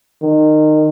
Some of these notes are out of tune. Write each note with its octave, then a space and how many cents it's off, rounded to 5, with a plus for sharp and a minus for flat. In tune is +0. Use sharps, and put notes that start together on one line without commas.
D#3 -20